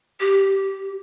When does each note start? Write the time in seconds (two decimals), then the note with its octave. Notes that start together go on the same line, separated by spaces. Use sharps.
0.20 G4